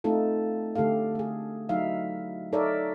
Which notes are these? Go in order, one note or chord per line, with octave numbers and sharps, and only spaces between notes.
A3 C4 D#4 F4 A4
D3 A3 G4 A4 F5
A3 G#4
F#3 D#4 E4 E5 F5
D#4 A4 A#4 C#5 D5 E5